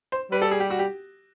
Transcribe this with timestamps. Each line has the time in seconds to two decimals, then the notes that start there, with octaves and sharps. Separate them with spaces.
0.12 C5
0.31 G3 B4
0.42 A4
0.51 G#4
0.60 G4
0.70 F#4
0.79 G4